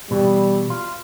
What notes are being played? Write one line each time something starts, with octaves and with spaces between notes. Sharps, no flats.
B2 E3 G3
F4